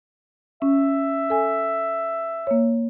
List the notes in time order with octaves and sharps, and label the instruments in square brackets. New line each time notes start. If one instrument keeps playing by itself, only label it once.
[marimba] C#4 [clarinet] E5
[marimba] A4 G#5
A#3 C#5